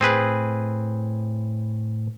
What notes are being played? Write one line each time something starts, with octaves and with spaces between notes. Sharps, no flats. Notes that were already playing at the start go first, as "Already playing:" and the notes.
A2 C4 G#4 B4